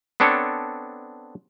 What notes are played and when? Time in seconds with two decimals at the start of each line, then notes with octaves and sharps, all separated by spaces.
0.20 B3 C4 D4 A4 C#5